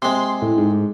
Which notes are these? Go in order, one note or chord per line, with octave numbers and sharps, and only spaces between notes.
C3 G#3 C6
A2
G#2